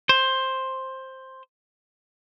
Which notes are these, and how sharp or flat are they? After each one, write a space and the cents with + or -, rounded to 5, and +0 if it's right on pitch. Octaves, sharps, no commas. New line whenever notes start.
C5 +10